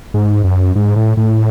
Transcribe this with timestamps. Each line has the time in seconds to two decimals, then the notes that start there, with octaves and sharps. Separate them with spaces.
0.14 G#2
0.44 F#2
0.76 G#2
0.96 A2
1.17 A2